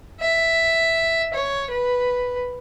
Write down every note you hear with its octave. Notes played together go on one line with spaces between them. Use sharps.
E5
C#5
B4